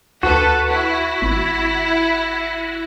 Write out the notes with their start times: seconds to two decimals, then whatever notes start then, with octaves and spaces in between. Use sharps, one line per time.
0.23 D2 F#4 A4 B4
0.68 E4
1.22 G#1